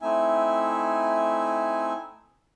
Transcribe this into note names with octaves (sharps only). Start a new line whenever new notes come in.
A3 C4 D#4 E4 E5 G#5